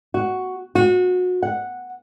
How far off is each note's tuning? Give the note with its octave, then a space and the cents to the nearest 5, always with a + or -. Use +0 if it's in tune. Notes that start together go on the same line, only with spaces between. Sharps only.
F#4 +5
F#4 -30
F#5 -5